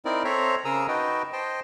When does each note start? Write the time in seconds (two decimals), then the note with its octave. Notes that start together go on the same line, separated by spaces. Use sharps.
0.05 C4 D#4 E4 A#4 D5
0.25 C4 A4 C5 C#5 E5 A#5
0.65 C#3 G#4 A#4 A#5 D#6 E6
0.88 D#4 F#4 B4 D#5 G5 A5
1.33 C5 D#5 G5 A5